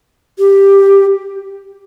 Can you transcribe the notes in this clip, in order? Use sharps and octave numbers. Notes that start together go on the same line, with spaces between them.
G4